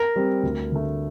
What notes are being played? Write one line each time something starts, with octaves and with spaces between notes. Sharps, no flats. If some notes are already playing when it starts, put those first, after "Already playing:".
Already playing: A#4
G3 C4
D2
D3 A3